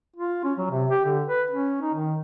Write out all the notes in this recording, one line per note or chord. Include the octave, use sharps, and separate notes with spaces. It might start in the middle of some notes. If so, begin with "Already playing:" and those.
F4
C#4
F#3
C3
G4
D3
B4
C#4
D#4
D#3